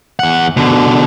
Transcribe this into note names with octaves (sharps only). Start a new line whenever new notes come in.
E2 F#5
B2 D3